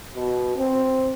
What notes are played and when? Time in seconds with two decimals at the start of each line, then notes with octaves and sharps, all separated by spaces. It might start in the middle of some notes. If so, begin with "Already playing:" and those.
0.15 B2
0.57 C4